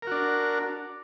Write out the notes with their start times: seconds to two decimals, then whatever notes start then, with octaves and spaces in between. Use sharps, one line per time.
0.02 A#4
0.07 F#4
0.11 D4